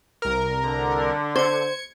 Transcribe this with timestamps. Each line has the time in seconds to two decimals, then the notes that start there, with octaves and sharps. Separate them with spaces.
0.22 C2 A#4
0.64 D3
1.36 C5 G#6 C#7